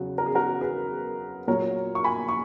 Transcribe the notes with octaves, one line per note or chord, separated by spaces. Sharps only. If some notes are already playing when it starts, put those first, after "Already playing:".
Already playing: E2 C#3 F#3 F#4
A#4
G#4
F#4 A#4
G#4 B4
A#2 F#3 A#4 C#5
C#6
G#5 B5
C#6